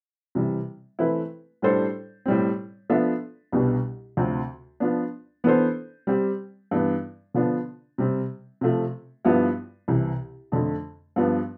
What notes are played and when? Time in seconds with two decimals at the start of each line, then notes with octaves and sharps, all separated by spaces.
0.35 C3 E3 G3
0.99 E3 A3 C4 E4 B4
1.62 A2 G3 D4 A4 C5
2.26 A2 G3 C4
2.90 F3 B3 D4 A4 E5
3.52 C2 B2 G3 B3 D4
4.17 D2 C3 F3 C4
4.80 F3 B3 D4
5.44 E3 B3 D4 A4 C5
6.07 G3 C4 G4
6.71 G2 E3 B3
7.34 D3 F3 B3 D4
7.98 C3 G3 C4
8.61 C3 F3 A3
9.25 G2 F3 B3 E4 G4
9.88 C2 C3 E3
10.52 F2 D3 A3
11.16 G2 F3 B3